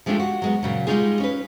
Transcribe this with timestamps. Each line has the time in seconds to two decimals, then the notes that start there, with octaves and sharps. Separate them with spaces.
0.06 F3 G#3 A3 D4 F4 G4
0.20 F#4
0.42 F#3 G#3 B3
0.63 A#2 C#3 F#3
0.87 G3 G#3 C#4 D#4 F4 G#4
1.20 C#4 B4